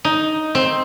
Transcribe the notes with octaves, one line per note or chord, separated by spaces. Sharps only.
D#4
C4